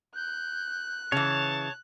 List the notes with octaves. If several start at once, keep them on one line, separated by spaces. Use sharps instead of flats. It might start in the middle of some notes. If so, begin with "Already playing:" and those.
F#6 G6
C#3 E3 C#5 A5